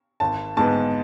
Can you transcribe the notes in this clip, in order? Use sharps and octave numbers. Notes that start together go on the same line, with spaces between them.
G#1 A5
G#2 G#3 B3 A5